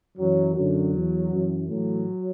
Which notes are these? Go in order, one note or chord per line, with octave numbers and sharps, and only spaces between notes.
F#2 E3 F#3
F#2 D3 F#3
E2 E3
F#2 E3
A2 E3 F#3